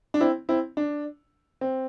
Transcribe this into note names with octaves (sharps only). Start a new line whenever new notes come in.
D4
C4 E4
C4 E4
D4
C4